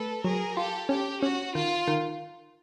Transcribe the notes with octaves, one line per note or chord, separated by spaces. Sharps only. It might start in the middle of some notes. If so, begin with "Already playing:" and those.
Already playing: A3 A4 B4
F#3 G#4 A#4
F4 G4 A4
C#4 G4
C#4 F#4
D#3 F4
D#3